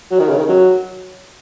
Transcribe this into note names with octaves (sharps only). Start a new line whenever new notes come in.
F#3
D#3
C#3
D#3
F#3